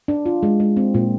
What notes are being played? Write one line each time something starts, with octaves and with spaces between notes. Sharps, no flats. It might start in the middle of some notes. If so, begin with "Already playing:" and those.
D4
F4
G#3
G#3
C4
A#2